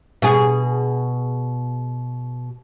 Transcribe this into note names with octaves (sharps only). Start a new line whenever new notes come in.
B2 G#4